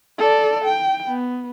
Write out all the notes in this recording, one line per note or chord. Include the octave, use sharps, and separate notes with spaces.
A4 D5
G5
B3